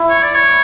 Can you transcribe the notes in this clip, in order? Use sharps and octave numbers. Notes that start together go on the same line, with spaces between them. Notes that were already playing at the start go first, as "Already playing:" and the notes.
Already playing: E4
C#5
D5
C#5